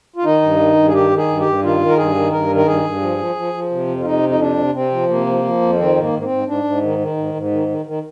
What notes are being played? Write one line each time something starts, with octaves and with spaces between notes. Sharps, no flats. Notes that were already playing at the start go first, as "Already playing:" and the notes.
F4
D#3 D#4
G2
D#3
G2
G#4
D#3 G4
D#3
G#4
G2
G4
G2
D#3 F4
D#3
A#4
G2 G#4
D#3
G2 A#4
D#3
A#4
G2 G#4
G2
F3
F3
F3
F3
C3
F2
F4
C3 D#4
F2
D#4
C3 D4
C3
C3 C4
F3
C3 A#3
F3
F3
F2
D#3 C4
G#2
A#3
G#2
A#3
C4
G#2
G#2 D4
G#2
D#3
D#3
G#2
G#2
D#3
D#3
D#3